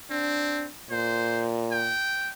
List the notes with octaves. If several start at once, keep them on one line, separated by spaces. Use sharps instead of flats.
C4 D4
A#2 C5
G5